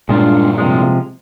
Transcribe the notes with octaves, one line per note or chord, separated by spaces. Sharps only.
G2 A#2 G#3 D4 F4
C3 F3 G#3